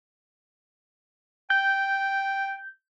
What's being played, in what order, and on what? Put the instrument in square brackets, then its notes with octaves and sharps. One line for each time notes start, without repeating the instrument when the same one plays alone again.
[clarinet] G5 [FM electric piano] G6